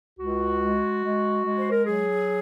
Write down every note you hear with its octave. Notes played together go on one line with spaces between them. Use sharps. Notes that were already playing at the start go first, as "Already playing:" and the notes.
C#2 F#4
G#3
G#3
G#3
C5
A#4
F#3 G#4